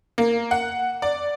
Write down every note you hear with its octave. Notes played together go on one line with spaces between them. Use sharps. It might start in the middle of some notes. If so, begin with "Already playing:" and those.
A#3
F#5
D5